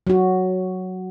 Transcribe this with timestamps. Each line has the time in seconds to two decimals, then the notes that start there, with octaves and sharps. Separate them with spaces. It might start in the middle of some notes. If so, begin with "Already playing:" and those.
0.07 F#3 F#4